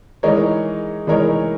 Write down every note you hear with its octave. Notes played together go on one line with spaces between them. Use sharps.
E3 G#3 D#4 A#4 C#5
E3 G#3 D#4 A#4 C#5